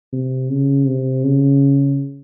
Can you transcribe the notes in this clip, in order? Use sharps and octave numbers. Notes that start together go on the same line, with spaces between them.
C3
C#3
C3
C#3